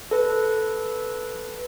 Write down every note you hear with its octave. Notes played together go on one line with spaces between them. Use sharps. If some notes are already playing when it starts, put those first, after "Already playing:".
A4 B4